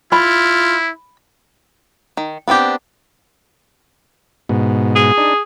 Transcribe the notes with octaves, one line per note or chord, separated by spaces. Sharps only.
E4 F4 B5
D#3
B3 C4 D4 G4
G#2 B2
G#4
D4 D#4